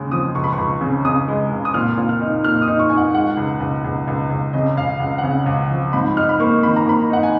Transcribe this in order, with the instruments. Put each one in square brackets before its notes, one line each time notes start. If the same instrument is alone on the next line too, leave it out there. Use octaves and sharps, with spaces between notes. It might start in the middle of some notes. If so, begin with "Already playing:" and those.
Already playing: [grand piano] D#2 C#3 G#3
F3 D#6
C#2 C#6
B5
C#6
C#2
C#3
C#3 D#6
G#3
C#2
D#6
A#2 F6
A#2
F6
D#4
A#2 F6
D#6
D#4
C#6
D#4 G#5
F#5
G#3 F#5
C#2
C#2
C#2
C#2
C#2
C#3 D#5
C#2 F5
C#2 F#5
F#5
C#3 F5
C#2
F3
G#2 B5
D#4 F6
B5
A#3 C#6
D#3 B5
A#5
A#3 B5
D#4 F#5
G#5